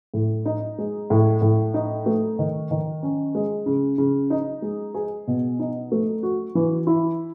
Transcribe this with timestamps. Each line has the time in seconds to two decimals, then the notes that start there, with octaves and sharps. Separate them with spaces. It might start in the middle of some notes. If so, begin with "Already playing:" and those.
0.14 A2
0.45 D#4
0.78 G#3
1.10 A2
1.42 A2
1.74 D#4
2.06 A3
2.39 D#3
2.71 D#3
3.03 C#4
3.35 G#3
3.66 C#3
3.98 C#3
4.30 D#4
4.62 G#3
4.94 G#4
5.28 B2
5.59 D#4
5.92 A3
6.23 F#4
6.55 E3
6.87 E4